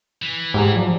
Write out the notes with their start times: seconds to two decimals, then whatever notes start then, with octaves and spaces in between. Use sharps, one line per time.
0.22 E3
0.54 G#2 G4 G#5 A#5
0.75 F3 F#3 D5